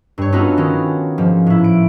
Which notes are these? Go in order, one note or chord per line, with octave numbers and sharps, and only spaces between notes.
G2 C#5
B3 C#4 D#4 F4 F#4 A4
D#3 C#4
G#2 F3
A2 E4
D7